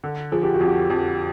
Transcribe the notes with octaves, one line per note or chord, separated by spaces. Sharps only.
D3
F3 G#4
G4
F#4
F2
G4
F2